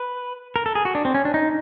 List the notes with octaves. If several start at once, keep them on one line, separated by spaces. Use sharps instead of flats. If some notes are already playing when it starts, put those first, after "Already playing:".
Already playing: B4
A#4
A4
G#4
F#4
D4
C4
C#4
D4
D#4